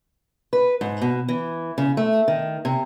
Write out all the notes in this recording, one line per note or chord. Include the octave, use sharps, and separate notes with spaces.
B4
G#2
B2
E3
C#3
A3
D#3
C3